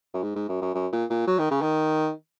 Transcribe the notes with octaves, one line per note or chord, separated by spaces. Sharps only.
F#2
G#2
G#2
F#2
F#2
F#2
A#2
A#2
F#3
D#3
C#3
D#3